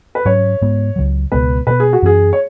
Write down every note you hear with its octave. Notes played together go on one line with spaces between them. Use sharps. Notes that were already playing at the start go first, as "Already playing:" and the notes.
B4
G#2 F#3 C#4 C#5
G#2 G#3 B3
C#2 C#3 F#3
C#2 B2 G#3 B3 B4
B2 F#3 B3 B4
G#4
F#4
F#2 E3 C#4 G#4
C#5